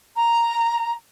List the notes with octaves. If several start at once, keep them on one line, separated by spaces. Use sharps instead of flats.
A#5